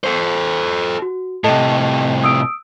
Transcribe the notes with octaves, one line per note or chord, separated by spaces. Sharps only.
A4 C5
F#4
A2 C3 A4 D#5 A5
D#6 E6 D7